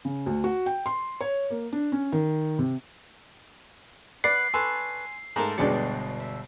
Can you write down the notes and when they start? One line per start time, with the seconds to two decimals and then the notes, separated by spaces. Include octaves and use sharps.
0.05 C#3
0.26 D2
0.44 F#4
0.66 G5
0.86 C6
1.21 C#5
1.50 A#3
1.73 D4
1.92 C#4
2.12 D#3
2.59 C3
4.24 B4 D5 F#5 C7
4.54 A4 B4 C#5 G#5 C6 E6
5.36 G#2 A3 A4 A#4 C5
5.58 G1 B2 F#3 G#3 D4 D5 G5 C#7
6.20 E5